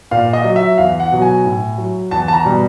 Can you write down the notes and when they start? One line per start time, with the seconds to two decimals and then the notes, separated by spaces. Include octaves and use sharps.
0.11 A#2 F5
0.33 D#5
0.44 F#3
0.56 E5
0.78 E2 F5
1.00 F#5
1.12 B2 F#3
1.22 G#5
1.45 A2
1.78 F#3
2.11 E2 A5
2.28 A5
2.33 A#5
2.45 B2 G3